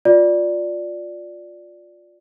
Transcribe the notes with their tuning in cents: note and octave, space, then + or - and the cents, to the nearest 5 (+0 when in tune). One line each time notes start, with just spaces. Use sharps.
F4 +20 D5 +0